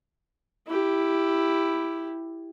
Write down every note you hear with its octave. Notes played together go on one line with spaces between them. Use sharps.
E4 G4